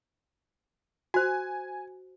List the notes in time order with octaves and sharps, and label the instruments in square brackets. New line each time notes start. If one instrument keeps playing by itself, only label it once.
[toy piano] F#4 C5 [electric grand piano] G#5